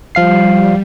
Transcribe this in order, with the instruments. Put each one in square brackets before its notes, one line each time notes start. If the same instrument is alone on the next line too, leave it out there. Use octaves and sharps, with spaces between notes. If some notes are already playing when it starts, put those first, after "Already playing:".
[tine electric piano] F3 F5 C7 [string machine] G3